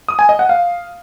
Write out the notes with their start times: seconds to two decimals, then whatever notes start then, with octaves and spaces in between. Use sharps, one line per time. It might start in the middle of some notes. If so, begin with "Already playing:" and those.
0.08 D#6
0.19 G#5
0.29 D#5
0.39 F#5
0.49 F5